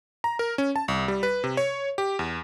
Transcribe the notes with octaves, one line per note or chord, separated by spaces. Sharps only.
A#5
A#4
C#4
A5
C2
G3
B4
C3
C#5
G4
E2